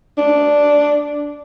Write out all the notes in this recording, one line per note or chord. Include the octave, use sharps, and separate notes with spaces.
D4